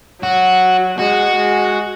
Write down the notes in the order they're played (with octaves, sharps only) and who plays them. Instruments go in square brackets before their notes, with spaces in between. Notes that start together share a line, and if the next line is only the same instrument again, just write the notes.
[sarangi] F#3 [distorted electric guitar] F#4
[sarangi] G#3 [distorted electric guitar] F#4
[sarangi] G#3